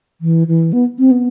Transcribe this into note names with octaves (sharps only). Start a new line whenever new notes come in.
E3
E3
B3
C4
B3